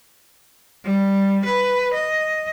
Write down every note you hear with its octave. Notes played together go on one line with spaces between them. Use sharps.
G3
B4
D#5